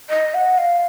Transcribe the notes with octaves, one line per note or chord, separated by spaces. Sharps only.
D#5
F#5
F5